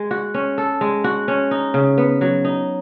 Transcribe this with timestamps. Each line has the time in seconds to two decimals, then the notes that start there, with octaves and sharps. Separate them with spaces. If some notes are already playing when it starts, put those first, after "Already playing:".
Already playing: G#3
0.11 F#4
0.34 C#4
0.58 A4
0.81 G#3
1.04 F#4
1.28 C#4
1.51 D#4
1.74 C#3
1.98 B3
2.21 F#3
2.45 D#4